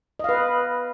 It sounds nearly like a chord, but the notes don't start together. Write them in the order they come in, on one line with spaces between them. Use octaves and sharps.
D#5 F5 B4